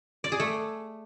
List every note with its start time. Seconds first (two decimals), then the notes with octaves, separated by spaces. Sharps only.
0.24 D5
0.32 G#4
0.40 A3